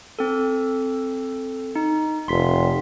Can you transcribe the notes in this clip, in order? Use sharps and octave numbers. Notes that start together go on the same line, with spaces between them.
C4 A4
D#4
F1 C6 B6